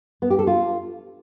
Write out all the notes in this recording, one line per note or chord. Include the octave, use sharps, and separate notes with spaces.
B3
G4
A4
F4